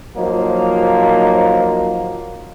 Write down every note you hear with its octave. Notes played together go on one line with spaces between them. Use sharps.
F3 F#3 A#3 D#4